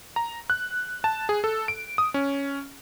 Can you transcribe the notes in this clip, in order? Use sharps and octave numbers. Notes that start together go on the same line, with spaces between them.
A#5
F#6
A5
G#4
A4
D7
D#6
C#4